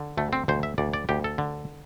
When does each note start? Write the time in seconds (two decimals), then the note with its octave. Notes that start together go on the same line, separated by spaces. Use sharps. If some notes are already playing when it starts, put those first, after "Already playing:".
Already playing: D3
0.17 D2 A3
0.33 C4
0.48 D2 C5
0.63 E5
0.78 D2 D5
0.94 D5
1.09 D2 G4
1.24 A4
1.38 D3